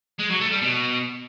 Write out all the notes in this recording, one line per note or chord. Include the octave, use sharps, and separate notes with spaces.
G#3
F#3
A3
G3
B2